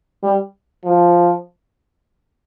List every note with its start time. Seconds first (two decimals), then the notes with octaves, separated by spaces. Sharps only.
0.23 G3
0.84 F3